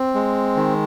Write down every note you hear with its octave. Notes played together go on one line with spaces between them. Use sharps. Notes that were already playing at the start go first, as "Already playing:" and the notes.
Already playing: C4
G#3
D#3